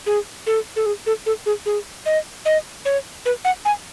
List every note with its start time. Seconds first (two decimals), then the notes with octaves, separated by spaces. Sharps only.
0.06 G#4
0.47 A4
0.76 A4
0.86 G#4
1.06 A4
1.26 A4
1.46 G#4
1.66 G#4
2.06 D#5
2.45 D#5
2.85 C#5
3.25 B4
3.45 F#5
3.65 G#5